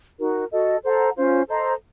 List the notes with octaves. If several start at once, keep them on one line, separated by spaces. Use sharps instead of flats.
D#4 F#4 A#4
F#4 A4 D#5
A4 C5 F#5 A#5
C#4 F4 C5
A4 C5 D#5 A#5